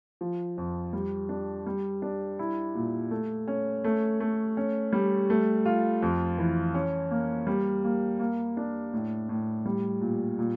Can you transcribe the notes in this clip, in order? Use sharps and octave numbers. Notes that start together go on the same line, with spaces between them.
F3
F2
G3
D4
G3
D4
E4
A#2
A3
C#4
A3
A3
C#4
G3
A3
F4
F2
E3
C#4
A#3
G3
A#3
A#3
D4
A2
A2
G3
A#2
A#2